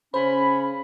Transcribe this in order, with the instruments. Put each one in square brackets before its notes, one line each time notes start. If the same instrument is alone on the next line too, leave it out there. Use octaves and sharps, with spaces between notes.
[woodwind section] C#3 C#4 [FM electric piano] C5 [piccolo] B5